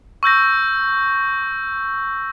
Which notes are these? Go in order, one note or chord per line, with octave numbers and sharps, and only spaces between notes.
C#6 E6 G6 A#6